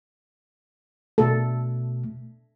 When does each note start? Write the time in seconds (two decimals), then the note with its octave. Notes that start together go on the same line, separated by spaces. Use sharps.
1.18 B2 A3 A4